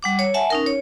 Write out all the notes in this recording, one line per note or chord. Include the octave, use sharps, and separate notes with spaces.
G3 F#5 D6
C#5
E5 F#5 G#5 A5
C#4 D#4 A#4
C#5